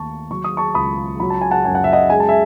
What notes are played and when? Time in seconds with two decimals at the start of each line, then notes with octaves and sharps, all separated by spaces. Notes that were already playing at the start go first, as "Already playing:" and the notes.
Already playing: D#2 A3 A5 C#6
0.31 F#3 C#6
0.44 D#6
0.57 A5 C#6
0.75 C#2 B5 D#6
1.20 F#3 B5
1.30 A5
1.41 G#5
1.51 F#5 A5
1.65 F#2 G#5
1.75 F#5
1.84 E5
1.93 D#5 F#5
2.10 G#3 G#5
2.20 A5
2.29 E5 G#5